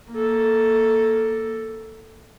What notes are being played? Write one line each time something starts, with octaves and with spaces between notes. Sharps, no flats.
A#3 A4